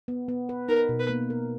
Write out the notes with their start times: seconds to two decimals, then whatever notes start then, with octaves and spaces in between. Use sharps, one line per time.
0.08 B3
0.29 B3
0.49 B4
0.69 D#4 A#4
0.89 B2
0.99 B4
1.09 A#3
1.30 A#4